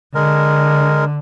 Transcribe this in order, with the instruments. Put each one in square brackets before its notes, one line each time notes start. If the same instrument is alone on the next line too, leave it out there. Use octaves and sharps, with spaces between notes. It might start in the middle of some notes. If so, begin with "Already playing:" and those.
[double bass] D3 [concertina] G#3 A#4